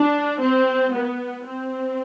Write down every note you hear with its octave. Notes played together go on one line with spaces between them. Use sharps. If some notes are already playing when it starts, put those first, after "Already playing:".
Already playing: D4
C4
B3
C4